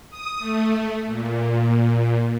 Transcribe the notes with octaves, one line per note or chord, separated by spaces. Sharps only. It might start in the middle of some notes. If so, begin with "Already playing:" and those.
D#6
A3
A#2